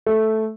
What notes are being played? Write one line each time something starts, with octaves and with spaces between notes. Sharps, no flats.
A3